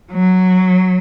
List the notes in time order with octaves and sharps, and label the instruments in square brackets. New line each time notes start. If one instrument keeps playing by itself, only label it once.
[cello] F#3